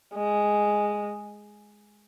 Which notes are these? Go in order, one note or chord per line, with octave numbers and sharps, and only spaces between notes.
G#3